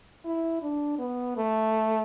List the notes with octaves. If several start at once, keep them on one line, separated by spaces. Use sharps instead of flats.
E4
D4
B3
A3